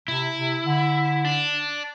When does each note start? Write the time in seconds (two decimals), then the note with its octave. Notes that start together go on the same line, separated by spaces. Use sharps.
0.08 C3 E4
0.37 C3
0.66 D3
1.24 D4